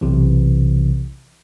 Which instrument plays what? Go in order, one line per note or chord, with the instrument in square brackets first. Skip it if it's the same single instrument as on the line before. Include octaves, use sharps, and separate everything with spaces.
[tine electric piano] B1 C3 E3